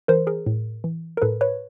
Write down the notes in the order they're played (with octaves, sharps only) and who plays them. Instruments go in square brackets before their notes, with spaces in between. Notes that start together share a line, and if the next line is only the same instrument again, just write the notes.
[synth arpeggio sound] E3 A#4 C5
G#4 A#4
A2
E3
A#4
A2 A4 B4
B4 C#5